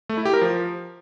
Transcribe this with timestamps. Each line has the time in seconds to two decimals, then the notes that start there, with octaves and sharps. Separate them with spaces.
0.09 A3
0.17 E4
0.25 G4
0.33 A#4
0.41 F3